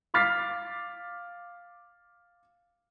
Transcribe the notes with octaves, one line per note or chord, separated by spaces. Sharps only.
F5 D6 F6 A6 B6 C7